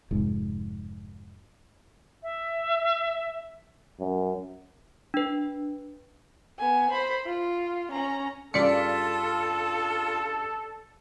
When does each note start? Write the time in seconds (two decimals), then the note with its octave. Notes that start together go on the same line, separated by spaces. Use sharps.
0.11 F1 G#2
2.23 E5
4.00 F#2
5.14 D4 B4
6.59 B3 G#5
6.91 C5 B5
7.26 F4
7.91 C#4 A#5
8.54 G2 C#3 F4 A4 D5 B6 C#7